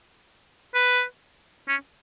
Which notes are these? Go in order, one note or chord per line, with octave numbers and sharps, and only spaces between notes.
B4
C#4